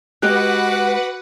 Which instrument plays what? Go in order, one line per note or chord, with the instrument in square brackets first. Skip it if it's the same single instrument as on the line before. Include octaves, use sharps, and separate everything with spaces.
[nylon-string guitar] G#3 G4 D#5 [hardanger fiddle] F#4 D6 [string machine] B4 F#5 [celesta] F#6